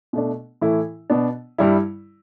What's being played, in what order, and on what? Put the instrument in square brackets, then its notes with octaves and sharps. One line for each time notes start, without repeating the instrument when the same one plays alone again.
[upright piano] B2 A3 D4
A2 E3 A3 E4
B2 B3 D4
G2 G3 E4